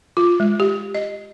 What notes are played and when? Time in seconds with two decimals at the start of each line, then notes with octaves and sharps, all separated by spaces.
0.17 F4
0.40 G#3
0.60 G4
0.95 D#5